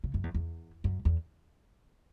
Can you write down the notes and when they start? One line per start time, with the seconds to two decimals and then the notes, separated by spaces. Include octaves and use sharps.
0.04 C#3
0.14 F#2
0.24 E2
0.34 E2
0.84 F#2
1.05 E2